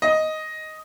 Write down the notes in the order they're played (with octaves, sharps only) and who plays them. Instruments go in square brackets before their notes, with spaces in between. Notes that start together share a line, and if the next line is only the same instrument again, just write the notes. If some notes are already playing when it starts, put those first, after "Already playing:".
[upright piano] D#5